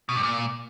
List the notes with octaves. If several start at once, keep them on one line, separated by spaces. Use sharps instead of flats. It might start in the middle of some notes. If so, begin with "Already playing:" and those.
B2
G2
A#2